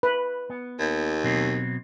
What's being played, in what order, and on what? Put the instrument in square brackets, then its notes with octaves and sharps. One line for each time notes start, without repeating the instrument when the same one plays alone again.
[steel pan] B4
[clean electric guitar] B3
[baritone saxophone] D#2
[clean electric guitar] B2 F#3 C4